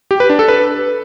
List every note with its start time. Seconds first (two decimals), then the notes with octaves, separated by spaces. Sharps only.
0.11 G4
0.20 B4
0.30 D4
0.39 A4
0.48 B4